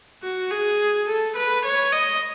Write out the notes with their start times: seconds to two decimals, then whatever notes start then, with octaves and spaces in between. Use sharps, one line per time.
0.23 F#4
0.51 G#4
1.08 A4
1.36 B4
1.65 C#5
1.92 D#5